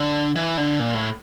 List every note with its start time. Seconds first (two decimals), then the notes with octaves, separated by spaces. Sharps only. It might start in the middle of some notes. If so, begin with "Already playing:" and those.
Already playing: D3
0.35 E3
0.57 D3
0.80 A#2
0.94 A2